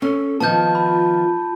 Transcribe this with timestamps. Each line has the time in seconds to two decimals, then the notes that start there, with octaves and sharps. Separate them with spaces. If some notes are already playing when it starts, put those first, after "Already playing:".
0.02 C#4 A4
0.40 D#3 F3 B3 F4 A5 G6
0.75 B5